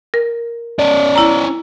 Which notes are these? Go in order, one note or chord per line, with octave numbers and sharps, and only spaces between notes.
A#4
C#4 D5
E4 A#5